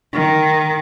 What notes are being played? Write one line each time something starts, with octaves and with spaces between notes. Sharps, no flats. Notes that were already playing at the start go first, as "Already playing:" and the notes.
D#3